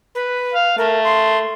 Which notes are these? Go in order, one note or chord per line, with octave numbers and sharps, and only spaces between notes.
B4
F5
A3 A#4
C6